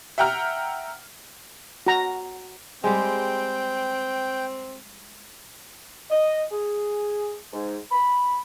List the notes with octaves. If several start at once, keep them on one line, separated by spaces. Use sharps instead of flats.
E5 F#5 G5 A#5 F6
F#4 A#5
G3 G#3 C4 G5
D#5
G#4
G#2
B5